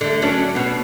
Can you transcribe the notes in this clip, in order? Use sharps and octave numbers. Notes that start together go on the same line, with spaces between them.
D3 A3
F#3 C#4 D4
B2 B3